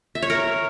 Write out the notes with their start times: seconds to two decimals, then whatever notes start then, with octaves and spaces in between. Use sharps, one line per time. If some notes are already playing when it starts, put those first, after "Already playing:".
0.15 E5
0.22 C#5
0.30 A#4